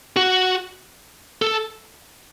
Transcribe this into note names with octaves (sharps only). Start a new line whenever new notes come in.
F#4
A4